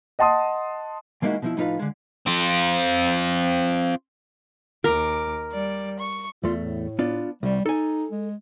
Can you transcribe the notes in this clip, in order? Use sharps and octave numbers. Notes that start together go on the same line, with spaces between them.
D#5 F#5 A5 C6 D#6
E3 G#3 A#3 D#4 E4 F#4
B2 F3 E4
A2 F3 D#4 F4 B4 F5
D3 G#3
C4 F4
D#2 A#4 D6
G3 D5
C#6
E2 A3 F4
A2
B3 D4 F4
C2 G3
D#4 A4 G#5
G#3